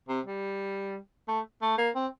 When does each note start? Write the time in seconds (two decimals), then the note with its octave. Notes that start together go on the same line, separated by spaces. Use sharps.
0.09 C3
0.26 G3
1.28 A3
1.62 A3
1.78 A#3
1.95 C4